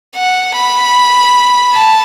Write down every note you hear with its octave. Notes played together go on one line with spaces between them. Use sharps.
F#5
B5
A5